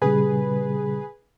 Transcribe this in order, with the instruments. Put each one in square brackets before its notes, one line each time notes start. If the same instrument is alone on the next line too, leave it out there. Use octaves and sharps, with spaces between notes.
[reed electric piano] A#2 C#3 G3 [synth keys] G#4 B4